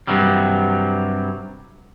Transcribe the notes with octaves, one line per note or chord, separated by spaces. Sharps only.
G2 C3 F#3 G3